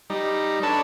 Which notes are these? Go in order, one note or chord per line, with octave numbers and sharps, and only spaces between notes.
G3 D#4
D4 A4 B4 C#5 A5